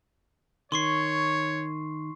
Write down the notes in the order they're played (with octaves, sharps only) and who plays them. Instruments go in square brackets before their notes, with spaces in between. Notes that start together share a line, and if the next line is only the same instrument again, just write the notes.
[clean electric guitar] D#3 [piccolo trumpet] C#5 [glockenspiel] C6 C#6 C7